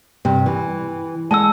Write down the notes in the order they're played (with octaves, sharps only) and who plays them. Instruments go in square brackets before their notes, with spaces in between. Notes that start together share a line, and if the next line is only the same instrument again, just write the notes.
[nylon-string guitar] G2 C3
E3
[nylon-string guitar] G#3 F#5 [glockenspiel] A5 E6